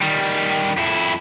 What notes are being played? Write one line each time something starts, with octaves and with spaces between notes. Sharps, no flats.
D#3 G3
F2 E4